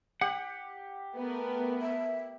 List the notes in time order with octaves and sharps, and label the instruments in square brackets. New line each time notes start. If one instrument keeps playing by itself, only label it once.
[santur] G4 [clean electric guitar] F#5
[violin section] A3 B3 A#4
[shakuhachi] E5